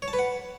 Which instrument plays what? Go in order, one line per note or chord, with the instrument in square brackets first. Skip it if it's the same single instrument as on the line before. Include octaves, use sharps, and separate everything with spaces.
[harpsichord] C#5
A5
B4
F#5